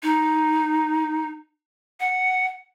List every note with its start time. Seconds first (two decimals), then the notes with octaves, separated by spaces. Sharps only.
0.03 D#4
2.00 F#5